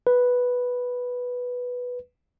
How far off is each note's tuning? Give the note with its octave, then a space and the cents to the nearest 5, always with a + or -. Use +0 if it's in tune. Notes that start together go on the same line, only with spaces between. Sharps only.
B4 -5